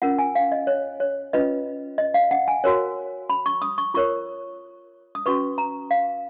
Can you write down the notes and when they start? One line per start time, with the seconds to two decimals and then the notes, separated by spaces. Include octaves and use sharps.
0.02 C#4 F4 A#4 F#5
0.19 G#5
0.35 F5
0.52 D#5
0.67 C#5
1.00 C#5
1.33 C#4 F4 B4 D#5
1.98 D#5
2.14 F5
2.31 F#5
2.48 G#5
2.64 F#4 A#4 C#5
3.30 B5
3.46 C#6
3.62 D#6
3.78 C#6
3.94 F4 A#4 C#5 C#6
5.15 D#6
5.26 C#4 F#4 B4 C#6
5.58 A#5
5.91 F5